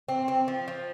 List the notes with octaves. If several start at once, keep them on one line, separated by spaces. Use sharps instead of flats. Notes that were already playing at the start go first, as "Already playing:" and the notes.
C4
C4
F3
F3